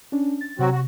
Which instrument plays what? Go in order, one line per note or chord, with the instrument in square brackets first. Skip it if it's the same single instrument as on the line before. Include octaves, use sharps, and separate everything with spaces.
[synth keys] C#4 D4
A6
[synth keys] C3 [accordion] F#3 C4 F#4
[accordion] F#4